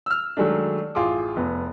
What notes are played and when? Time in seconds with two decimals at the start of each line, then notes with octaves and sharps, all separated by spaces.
0.06 E6 F6
0.37 D#3 F#3 G#3 A3 D4
0.95 A1 F4 G#4 C6 D6
1.36 F1 B3